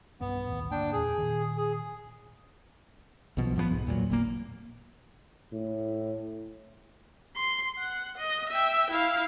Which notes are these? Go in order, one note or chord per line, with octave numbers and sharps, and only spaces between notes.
B1 G2 B2 B3
A1 D#2 A2
G1 D2 A#3 D4 G5
E2 A#2 G#4
A#2 D#3
G#4
B1 B2 F3
A2 F3 A3 B3
B1 G#2
E2 A#2 E3 F#3
G#1 A#2 A#3
A2
C6
F#5
D#5
E5 G5
E4 F5